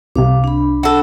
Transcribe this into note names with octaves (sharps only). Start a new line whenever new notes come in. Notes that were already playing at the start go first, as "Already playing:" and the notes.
C2 C3 F5 D6
D4 B5
F#4 A4